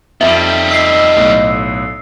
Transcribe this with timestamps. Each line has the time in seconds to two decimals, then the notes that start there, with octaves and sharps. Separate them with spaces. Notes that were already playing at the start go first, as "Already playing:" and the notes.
0.21 F2 D#3 G3 C4 E5
0.71 D#5 E6 C7
1.16 B1 A2